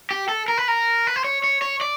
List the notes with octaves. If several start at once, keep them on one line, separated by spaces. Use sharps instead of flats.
G4
A4
A#4
B4
A#4
B4
C5
C#5
C#5
C#5
D5